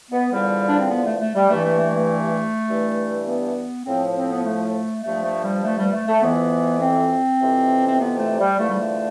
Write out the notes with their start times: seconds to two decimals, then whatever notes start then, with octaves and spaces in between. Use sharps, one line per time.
0.11 B3
0.31 E2 D3 F3 G3
0.69 D4
0.80 C4
0.90 B3
1.05 A3
1.20 A3
1.35 G3
1.49 G2 E3 A3
1.64 A3
1.79 A3
1.94 A3
2.67 G2 E3
3.26 B3
3.86 A2 F3 C4
4.16 C4
4.30 B3
4.45 A3
5.04 G2 F3 A3
5.23 A3
5.43 G3
5.64 A3
5.78 G3
5.92 A3
6.07 A3
6.22 F2 E3 B3
6.81 C4
7.40 F2 C3 E3
7.88 C4
8.00 B3
8.19 A3
8.39 G3
8.58 E2 D3 F3 A3
8.70 G3
8.80 A3